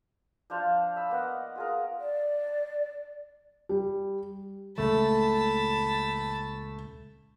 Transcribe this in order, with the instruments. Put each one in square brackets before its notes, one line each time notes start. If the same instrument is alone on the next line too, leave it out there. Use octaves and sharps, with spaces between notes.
[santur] F3 D4 C5 F5
E5 B5
A#3 B3 D#5 F#5
F4 G#4 A#4
[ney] D5
[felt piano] G3
[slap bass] C#2 A#2 C#3 [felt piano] A3 [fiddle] A5 B5